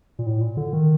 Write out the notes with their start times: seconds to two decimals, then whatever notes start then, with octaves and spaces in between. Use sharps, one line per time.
0.19 A#2
0.26 A2
0.41 A#2
0.57 D3
0.73 D#3